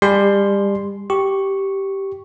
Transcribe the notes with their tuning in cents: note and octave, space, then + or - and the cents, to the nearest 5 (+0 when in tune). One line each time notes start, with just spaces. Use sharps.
G3 +30 G#5 +40 C6 +0
G4 -10 C#6 -5